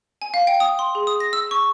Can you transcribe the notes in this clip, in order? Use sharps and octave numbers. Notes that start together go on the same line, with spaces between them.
G#5
F5
G5
D#6
C6
G#4
D#6
A#6
E6
C#6